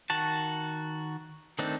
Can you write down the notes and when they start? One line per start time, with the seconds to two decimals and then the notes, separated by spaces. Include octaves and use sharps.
0.10 D#3 F#4 A5
1.59 D#3 A3 C4 D4 D#4